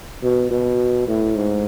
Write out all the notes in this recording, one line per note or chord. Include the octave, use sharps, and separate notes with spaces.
B2
B2
A2
G#2